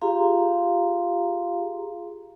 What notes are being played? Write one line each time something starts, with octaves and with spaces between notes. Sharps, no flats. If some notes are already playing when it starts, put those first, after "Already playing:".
F4 G4 G#4 F5 A#5 C6